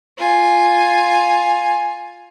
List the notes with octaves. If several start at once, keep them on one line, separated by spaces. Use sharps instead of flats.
F4 G#5